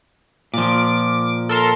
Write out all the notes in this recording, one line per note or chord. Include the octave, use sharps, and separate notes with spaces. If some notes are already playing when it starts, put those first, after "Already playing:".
A#2 F3 D6
A4 A#4 C6